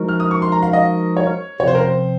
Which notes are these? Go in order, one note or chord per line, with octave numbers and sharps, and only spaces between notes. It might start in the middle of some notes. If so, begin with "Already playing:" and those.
Already playing: F3 G#3 D#4 F#4 A#4
F6
D#6
C#6
C6
A#5
F5
D#5
C#5
C3 F3 C4 C#5
C5
A#4
C5